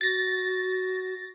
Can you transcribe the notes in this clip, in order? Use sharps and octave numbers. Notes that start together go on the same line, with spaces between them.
F#4 A6 A#6